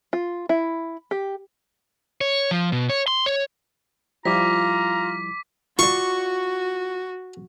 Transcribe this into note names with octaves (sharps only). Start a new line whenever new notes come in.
F4
E4
G4
C#5
F3
B2
C#5
C6
C#5
F3 G3 E4 F4 A#5 D6 B6
F4 F#4 D5 C#6